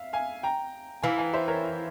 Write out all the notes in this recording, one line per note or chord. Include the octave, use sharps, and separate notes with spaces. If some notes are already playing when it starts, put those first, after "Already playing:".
Already playing: E5 F5
F5 G#5
G5 A#5
E3 F5 G#5
F5 G#5
C5 E5
A#4 C#5